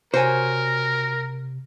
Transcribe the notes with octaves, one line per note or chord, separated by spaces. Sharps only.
C3 F#4 A#4 C5 C#5 G#5